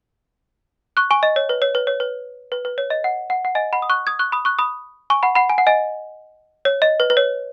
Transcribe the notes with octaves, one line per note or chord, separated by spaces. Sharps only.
C#6 F#6
G#5 C#6
D#5
C#5
B4
C#5
B4
C#5
B4
B4
B4
C#5
D#5
F#5
F#5
F#5
D#5 G#5
F#5 B5
D#6
C#6 F#6
D#6 G#6
C#6 F#6
B5 D#6
C#6 F#6
B5 D#6
G#5 C#6
F#5 B5
F#5 B5
G#5
F#5
D#5 G#5
C#5
D#5
B4
B4
C#5